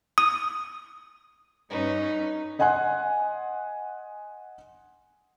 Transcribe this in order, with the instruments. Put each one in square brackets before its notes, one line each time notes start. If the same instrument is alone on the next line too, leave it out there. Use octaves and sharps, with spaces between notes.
[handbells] D#6
[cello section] G2 C#4 B4 [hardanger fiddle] D#4
[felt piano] D#5 F#5 G#5 C6 F#6